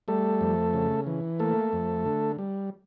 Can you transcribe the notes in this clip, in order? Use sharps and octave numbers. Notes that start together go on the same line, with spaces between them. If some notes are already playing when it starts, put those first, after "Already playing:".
G3 A3 A4
F2
C#3
E3
A3 A#3 A4
F2
D3
G3